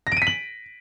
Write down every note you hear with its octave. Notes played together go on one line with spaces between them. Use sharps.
A#6
D7
D#7
B6
F#7